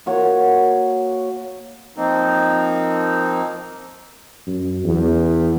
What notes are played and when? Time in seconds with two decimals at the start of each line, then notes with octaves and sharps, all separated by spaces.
0.06 A#3 F#4 C#5
1.97 F3 A#3 C4 D#4
4.47 F#2
4.85 E2